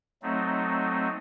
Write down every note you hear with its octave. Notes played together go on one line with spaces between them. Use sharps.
F#3 A3 C4 D#4